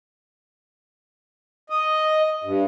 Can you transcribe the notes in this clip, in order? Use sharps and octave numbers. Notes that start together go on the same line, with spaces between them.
D#5
G2